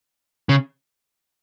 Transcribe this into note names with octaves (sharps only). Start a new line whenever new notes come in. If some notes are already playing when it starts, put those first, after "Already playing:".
C#3